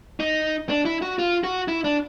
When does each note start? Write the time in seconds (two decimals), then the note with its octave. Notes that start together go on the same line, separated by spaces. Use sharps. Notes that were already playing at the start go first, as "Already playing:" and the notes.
0.20 D#4
0.69 D4
0.85 E4
1.02 F#4
1.19 F4
1.44 F#4
1.68 E4
1.84 D4